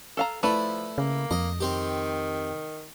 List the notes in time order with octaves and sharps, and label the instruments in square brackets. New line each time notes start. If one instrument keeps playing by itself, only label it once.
[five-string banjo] A4 F5 A#5
[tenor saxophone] F3 [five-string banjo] A3 B4 D5 [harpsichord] E4
[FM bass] C#3 [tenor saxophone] A#3
[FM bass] F2 [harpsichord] D#5
[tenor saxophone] D#3 [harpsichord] C4 G4